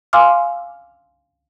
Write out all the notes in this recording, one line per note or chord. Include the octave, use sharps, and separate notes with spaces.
F5 G#5 C6 D6 E6 F6